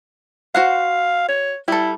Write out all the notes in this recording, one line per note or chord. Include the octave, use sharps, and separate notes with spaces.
F#4 C5 F5 F#5
C#5
G3 E4 A4